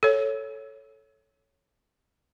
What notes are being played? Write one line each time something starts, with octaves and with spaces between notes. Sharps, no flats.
A4 C#5